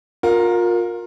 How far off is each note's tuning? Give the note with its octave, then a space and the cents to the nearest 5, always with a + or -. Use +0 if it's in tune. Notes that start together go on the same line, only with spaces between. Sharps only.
F4 +30 A#4 +0